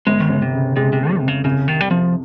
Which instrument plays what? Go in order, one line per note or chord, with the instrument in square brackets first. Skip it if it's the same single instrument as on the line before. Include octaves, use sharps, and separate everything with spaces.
[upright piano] G1 [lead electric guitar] G#3
[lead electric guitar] D#3
[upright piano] G1 [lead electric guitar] C#3
[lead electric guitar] C3
[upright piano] C#3
[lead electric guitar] C3 [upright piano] G#3
[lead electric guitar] C3
[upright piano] G#3
[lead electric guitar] G3
[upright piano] F2 [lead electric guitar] C3
[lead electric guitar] C#3
[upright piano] C2 [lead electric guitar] C#3
[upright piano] C3 [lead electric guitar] D#3
[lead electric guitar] G3
[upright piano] C3 [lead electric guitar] F3